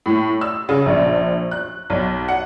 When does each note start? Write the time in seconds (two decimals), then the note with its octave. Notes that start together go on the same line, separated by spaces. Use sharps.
0.06 A2
0.41 E6
0.69 C#3
0.86 A#1
1.51 F#6
1.90 B1
2.28 F#5